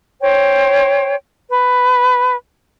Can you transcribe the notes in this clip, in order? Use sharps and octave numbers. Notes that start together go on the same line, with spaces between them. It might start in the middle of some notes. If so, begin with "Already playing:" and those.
C5 C#5 G5
B4